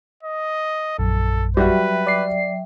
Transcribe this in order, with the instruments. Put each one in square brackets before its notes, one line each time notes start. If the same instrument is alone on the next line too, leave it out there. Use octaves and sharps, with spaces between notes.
[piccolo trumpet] D#5
[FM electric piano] A#1 F#2 [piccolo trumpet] A4
[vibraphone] F#3 E5 G5 [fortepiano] G3 F#4 [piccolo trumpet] B4
[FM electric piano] D5 C7